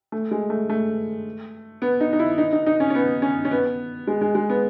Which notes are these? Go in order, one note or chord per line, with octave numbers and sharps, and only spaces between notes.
A3
G#3
A3
A3
B3
D#4
D#4
E4
D#4
D#4
D#4
C#4
C#4
B3
C#4
C#4
B3
G#3
G#3
G#3
B3